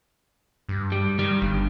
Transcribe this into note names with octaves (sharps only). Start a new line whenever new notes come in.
G2
G3
D#3 G3
G1 G2